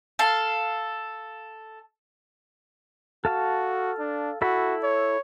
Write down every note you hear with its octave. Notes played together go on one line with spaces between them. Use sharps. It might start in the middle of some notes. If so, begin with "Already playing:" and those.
A4 F5
F#4 A4 F5 A5
D4
E4 F#4 A4 B5
C#5